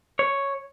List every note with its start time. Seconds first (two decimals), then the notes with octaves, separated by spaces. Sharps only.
0.19 C#5